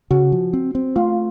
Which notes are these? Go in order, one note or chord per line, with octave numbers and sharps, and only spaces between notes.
C#3 F#4
F3
C4
C4
A3 F4